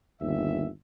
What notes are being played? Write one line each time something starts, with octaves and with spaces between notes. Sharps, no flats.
G1 D#2 E5